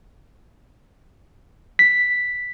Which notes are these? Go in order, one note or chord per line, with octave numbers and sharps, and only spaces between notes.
B6